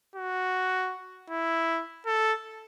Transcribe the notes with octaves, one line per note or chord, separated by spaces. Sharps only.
F#4
E4
A4